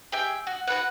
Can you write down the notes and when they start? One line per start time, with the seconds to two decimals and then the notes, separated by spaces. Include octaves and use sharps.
0.12 G4 G#4 E5 G5
0.47 F#4
0.67 F#4 A4 B4 F#5